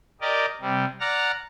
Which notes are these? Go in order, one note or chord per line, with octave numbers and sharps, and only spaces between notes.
G4 A#4 D5 D#5
C3 G3
D5 F#5 A#5 F6